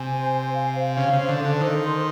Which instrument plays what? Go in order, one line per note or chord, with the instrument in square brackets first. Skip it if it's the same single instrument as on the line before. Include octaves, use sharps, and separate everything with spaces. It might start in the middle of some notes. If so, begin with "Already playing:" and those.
Already playing: [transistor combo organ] C3 [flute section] G#5
[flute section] C5
G#5
F5
C5
[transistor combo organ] C#3 [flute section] F5
[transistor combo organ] C#3
[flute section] C5
[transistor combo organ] D3
[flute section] A4
[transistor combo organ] D3
[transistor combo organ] D#3 [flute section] C5
[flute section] C6